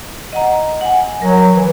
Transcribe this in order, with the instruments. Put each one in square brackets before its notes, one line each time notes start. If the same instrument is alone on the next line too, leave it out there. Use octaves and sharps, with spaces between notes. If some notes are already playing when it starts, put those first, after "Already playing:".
[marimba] D#5 F#5 A#5
F#5 G#5
[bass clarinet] F#3 [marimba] A#4
[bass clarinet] E3